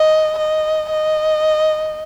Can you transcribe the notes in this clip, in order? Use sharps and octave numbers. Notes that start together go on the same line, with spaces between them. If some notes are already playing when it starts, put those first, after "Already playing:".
Already playing: D#5
D#5
D#5